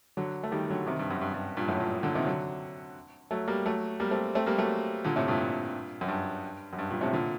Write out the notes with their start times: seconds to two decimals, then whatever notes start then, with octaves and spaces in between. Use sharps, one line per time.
0.17 D3 F#3
0.43 A3
0.52 D#3 G3
0.70 D3 F#3
0.87 C3 D#3
0.99 G2
1.11 F#2
1.21 G2
1.34 G2
1.57 G2 A#2
1.68 F#2 A2
1.79 G2 A#2
2.03 A#2 D3
2.15 C3 D#3
2.26 D3 F#3
3.31 F#3 A3
3.48 G3 A#3
3.66 F#3 A3
4.00 G3 A#3
4.11 A3 C4
4.35 A3 C4
4.46 G3 A#3
4.58 F#3 A3
5.04 A#2 D3
5.16 A2 C3
5.28 G2 A#2
6.01 F#2
6.08 G2
6.73 F#2
6.79 G2
6.90 G2 A#2
7.01 A2 C3
7.13 A#2 D3